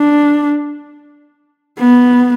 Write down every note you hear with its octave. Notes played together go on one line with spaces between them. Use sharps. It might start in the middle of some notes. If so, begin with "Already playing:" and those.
Already playing: D4
B3